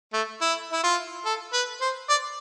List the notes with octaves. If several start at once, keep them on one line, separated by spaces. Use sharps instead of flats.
A3
E4
E4
F4
A4
B4
C5
D5